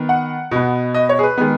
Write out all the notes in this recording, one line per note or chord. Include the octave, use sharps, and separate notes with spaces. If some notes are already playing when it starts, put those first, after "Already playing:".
Already playing: D#3 B3
F#5
B2 B3
D#5
C#5
G#4
B4
D#3 G#3 B3